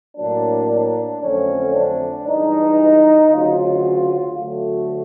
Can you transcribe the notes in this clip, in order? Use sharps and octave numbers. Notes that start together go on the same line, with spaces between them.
A2 F#3 A#3 D4
D4
F2 D3 F#3 A3 C4 C#4
D4
G2 E3 G#3 D#4
D2 C#3 F#3 F4
D2 D3 F#3 A3